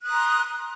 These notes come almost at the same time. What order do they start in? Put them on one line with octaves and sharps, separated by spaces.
F#6 D#6 A#5 C6